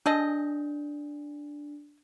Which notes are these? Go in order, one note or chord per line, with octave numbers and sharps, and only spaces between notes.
D4 G#4 A4 D#5